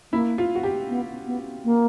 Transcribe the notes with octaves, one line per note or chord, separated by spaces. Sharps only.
A#3 E4
F4
F#4
G4
B3
B3
A#3